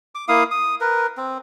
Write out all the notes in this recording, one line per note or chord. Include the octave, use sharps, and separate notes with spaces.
D6
A#3 E4 F5 D#6
D#6
A#4 B4
C4